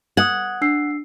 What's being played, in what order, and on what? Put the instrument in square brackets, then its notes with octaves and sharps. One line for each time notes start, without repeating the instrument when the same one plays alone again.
[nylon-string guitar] F#5 [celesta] D#6 G#6
[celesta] D4 E6 C7